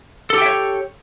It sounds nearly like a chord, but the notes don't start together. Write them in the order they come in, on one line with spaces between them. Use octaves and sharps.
A4 G4 G5 E5 C#5